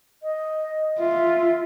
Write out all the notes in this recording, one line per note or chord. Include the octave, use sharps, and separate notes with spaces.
D#5
F4 E5